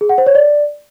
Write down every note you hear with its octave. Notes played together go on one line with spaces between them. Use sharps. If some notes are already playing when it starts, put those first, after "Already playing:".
G#4
F#5
C5
C#5
D5